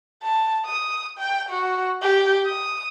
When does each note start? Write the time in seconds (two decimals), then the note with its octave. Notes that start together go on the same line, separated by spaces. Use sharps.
0.23 A5
0.66 D#6
1.18 G5
1.49 F#4
2.03 G4
2.47 D#6